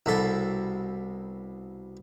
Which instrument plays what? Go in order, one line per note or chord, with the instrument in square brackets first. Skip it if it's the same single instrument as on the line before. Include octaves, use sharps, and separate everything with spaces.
[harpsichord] C2 B2 A4